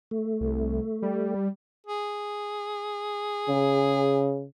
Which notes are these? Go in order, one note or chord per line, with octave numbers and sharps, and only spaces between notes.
A3
C2
G3
G#4
C#3